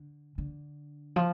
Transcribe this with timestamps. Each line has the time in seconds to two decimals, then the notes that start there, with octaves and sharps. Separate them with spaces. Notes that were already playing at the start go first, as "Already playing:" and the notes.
Already playing: D3
0.38 D3
1.16 F3